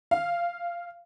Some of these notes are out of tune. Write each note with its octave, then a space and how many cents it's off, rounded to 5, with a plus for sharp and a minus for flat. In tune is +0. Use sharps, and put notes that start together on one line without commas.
F5 -15